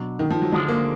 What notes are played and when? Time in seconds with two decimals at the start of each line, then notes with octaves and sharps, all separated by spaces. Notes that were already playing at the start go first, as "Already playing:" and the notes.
Already playing: B2 F#3 D4
0.19 D#3
0.30 F3
0.42 F#3
0.52 D2 D3 F3 F#3 G#3 D4
0.68 A#3